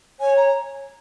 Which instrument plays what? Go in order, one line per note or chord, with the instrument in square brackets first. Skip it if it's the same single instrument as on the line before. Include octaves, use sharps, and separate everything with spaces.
[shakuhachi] C#5 [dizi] G#5
[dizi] A#5